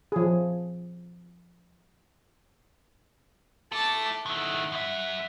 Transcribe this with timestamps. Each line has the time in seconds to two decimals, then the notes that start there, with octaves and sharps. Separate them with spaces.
0.12 F3 G#4
3.72 E4 A4 A5 D6
4.26 D#3 E4 F#5
4.72 F#2 E5